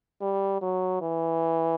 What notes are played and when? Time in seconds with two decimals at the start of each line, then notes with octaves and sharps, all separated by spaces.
0.21 G3
0.62 F#3
1.01 E3